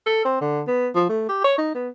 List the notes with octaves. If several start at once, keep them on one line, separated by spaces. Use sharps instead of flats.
A4
C4
D3
B3
F3
A3
G4
C#5
D#4
B3